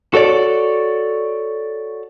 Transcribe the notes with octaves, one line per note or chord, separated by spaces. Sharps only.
F#4 A4 C#5 D5